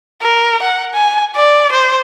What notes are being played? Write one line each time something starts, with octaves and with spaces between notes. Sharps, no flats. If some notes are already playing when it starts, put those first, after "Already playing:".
A#4
F#5
G#5
D5
C5